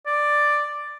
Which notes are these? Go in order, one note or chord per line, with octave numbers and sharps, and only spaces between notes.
D5